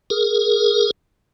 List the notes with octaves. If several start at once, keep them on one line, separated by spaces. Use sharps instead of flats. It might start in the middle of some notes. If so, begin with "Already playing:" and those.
G#4 A#4